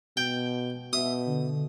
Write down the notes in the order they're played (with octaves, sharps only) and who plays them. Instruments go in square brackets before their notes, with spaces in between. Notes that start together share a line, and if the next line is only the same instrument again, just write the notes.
[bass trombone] B2 [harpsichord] G5
[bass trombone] B2 [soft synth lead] E5 [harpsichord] D#6
[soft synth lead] D3